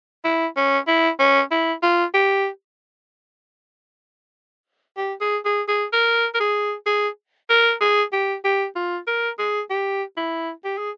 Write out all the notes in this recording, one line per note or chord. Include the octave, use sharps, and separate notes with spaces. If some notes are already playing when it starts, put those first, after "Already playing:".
E4
C#4
E4
C#4
E4
F4
G4
G4
G#4
G#4
G#4
A#4
A#4
G#4
G#4
A#4
G#4
G4
G4
F4
A#4
G#4
G4
E4
G4
G#4